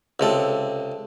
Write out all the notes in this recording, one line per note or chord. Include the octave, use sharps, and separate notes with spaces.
C#2 C3 A4